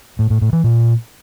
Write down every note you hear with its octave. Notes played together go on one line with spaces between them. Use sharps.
A2
A2
A2
E3
A#2